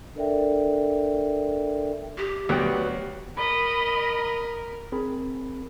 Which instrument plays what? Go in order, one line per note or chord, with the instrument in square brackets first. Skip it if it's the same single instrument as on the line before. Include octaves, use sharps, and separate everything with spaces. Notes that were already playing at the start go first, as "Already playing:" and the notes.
[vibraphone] D4 A4 A#4 D5 E5 G5
[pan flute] G4
[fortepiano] D2 G5 [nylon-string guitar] F#3 B3
[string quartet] A#4 [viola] D#5 [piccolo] B5
[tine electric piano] C4 G#4 A#4 B5